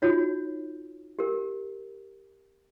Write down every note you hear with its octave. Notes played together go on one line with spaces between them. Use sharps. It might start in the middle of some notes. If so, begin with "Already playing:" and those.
D#4 F4 F#4 C#5
G4 A#4